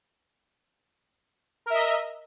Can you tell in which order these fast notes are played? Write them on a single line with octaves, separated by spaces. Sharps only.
A#4 E5 D#5